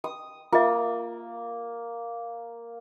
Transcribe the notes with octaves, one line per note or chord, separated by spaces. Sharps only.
D#6
A#3 F4 E5